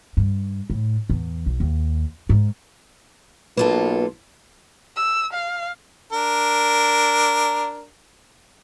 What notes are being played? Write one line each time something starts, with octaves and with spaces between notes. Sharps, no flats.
G2
A2
E2
B1
D#2
G#2
B1 A#3 F4 A4 B4
E6
F5
D4 A#4